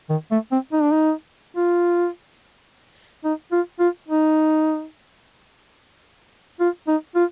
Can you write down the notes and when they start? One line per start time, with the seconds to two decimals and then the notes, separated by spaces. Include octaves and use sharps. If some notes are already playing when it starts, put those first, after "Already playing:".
0.09 D#3
0.31 A3
0.52 C4
0.73 D#4
0.82 D4
0.92 D#4
1.56 F4
3.24 D#4
3.52 F4
3.80 F4
4.08 D#4
6.60 F4
6.88 D#4
7.15 F4